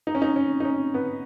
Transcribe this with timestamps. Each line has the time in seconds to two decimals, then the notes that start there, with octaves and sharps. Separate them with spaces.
0.07 D#4
0.15 C#4
0.22 D#4
0.36 C#4
0.60 D#4
0.65 C#4
0.94 B3